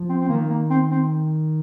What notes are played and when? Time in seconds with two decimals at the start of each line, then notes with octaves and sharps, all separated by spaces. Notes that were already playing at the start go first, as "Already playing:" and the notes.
Already playing: F3
0.09 C4
0.20 C4
0.29 D#3 A#3
0.50 A#3
0.70 C4
0.91 C4